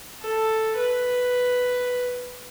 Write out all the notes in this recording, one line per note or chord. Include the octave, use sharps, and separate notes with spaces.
A4
B4